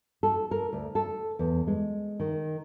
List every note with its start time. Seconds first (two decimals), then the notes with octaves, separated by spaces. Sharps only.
0.23 A4
0.51 A#4
0.73 D2
0.95 A4
1.39 E2
1.67 G#3
2.20 D#3